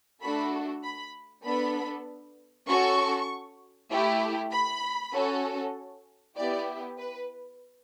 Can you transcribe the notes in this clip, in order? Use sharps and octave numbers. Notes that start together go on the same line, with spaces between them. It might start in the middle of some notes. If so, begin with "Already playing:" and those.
A3 D4 F#4 A4 B5
B5
B3 D4 A4 B5
C#4 F#4 A4 C#6
A3 E4 G4
B5
C#4 F#4 A4
B3 E4 G4 D5
B4